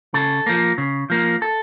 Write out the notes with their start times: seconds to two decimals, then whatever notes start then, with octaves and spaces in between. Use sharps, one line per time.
0.14 C#3 A4
0.46 F3 A#3
0.78 C#3
1.10 F3 A#3
1.42 A4